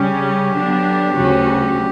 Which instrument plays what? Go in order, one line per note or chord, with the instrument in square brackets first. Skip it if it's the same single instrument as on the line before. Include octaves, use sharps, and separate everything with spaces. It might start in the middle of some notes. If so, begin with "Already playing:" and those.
Already playing: [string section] C#3 G3 C#4 [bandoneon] G4
[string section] D3 F#3 B3 D4
D2 C#3 F#3 C#4 F#4